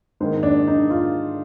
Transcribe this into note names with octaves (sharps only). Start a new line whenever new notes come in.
G#2 D#3 A#3 C5
D4
D#4
F4